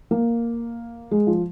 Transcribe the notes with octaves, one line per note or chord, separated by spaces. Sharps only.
A#3
G#3
F3